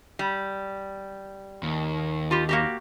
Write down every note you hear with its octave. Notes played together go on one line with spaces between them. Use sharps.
G3
D#2
F4 G4
A#3 F#4 G4